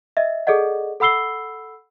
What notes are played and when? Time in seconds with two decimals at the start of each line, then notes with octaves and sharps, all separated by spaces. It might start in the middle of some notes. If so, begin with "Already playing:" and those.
0.17 D#5 E5
0.47 G#4 A4 D5 D#5 F#5
1.00 A4 F#5 B5 E6 C7 G7